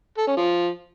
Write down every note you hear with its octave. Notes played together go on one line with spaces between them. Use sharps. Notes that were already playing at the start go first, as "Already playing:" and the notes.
A4
C#4
F3